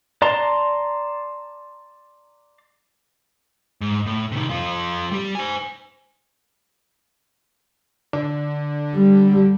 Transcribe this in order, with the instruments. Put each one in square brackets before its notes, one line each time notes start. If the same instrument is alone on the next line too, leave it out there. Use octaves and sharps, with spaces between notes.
[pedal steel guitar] D5 A5 A#5 C6
[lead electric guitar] G#2
A2
C3 D#3
F2 F4
G3 G4
C5 G#5
[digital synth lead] D3
[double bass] G3